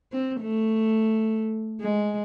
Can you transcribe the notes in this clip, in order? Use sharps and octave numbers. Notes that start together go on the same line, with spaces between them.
C4
A3
G#3